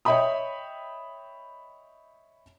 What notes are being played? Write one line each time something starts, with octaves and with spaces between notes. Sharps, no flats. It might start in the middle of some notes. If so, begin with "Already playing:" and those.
C#5 D#5 E5 G5 B5 D#6